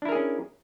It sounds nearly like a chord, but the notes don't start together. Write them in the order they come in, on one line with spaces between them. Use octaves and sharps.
D4 E4 A#4 G#4 C#4